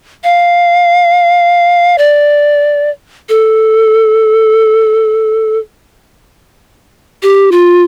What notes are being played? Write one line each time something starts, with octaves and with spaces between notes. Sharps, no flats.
F5
D5
A4
G4
F4